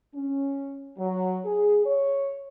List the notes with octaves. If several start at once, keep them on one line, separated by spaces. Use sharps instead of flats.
C#4
F#3
G#4
C#5